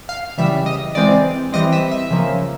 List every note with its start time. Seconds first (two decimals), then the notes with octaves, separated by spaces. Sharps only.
0.09 F5
0.38 C#3 E3 G3 E5
0.66 D#5
0.95 E3 G#3 C4 D5
1.53 E3 G3 C4 D#5
1.73 E5
1.91 E5
2.11 C#3 F3 A#3